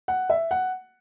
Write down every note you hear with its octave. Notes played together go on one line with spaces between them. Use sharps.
F#5
E5
F#5